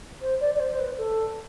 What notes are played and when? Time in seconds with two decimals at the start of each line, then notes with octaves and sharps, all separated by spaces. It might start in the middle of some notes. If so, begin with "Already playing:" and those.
0.22 C5
0.40 D5
0.54 D5
0.60 C5
0.71 C5
0.79 B4
0.98 A4